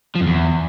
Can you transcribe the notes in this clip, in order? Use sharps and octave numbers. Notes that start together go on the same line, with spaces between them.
F3
F2
E2